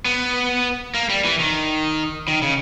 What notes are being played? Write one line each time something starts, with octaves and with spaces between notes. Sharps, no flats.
B3
A#3
G3
E3
D#3
D#3
C#3